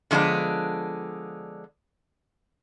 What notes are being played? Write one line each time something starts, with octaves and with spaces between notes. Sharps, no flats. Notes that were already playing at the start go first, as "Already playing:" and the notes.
D3 F3 G#3 B3 D4